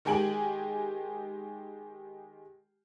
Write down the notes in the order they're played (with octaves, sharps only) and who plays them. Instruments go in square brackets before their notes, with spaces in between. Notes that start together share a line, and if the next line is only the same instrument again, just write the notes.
[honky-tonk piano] D#3 G#3 G4 G#5 D7 F#7